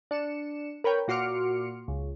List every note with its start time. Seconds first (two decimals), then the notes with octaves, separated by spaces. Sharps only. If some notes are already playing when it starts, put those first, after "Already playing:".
0.11 D4 C#7 E7
0.84 A#4 B4 C#5 G5
1.08 A#2 F#4 C6 D6 F6 C#7
1.88 C#2